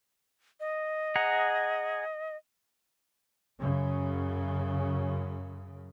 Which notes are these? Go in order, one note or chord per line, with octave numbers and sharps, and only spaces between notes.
D#5
G#4 F#5 A#5
F#2 C#3